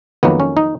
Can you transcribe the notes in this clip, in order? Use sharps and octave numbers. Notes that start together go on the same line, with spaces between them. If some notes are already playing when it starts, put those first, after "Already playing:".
F2 D#3 F#3 A#3 B3
C#4
D#4